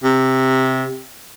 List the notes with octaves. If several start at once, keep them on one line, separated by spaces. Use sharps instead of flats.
C3